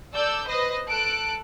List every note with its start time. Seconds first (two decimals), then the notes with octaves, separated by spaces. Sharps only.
0.15 A4 D5 E6 G6
0.47 B4 C5 D#5
0.88 A4 F#6 D7